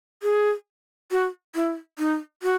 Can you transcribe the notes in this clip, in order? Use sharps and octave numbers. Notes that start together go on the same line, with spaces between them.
G#4
F#4
E4
D#4
F#4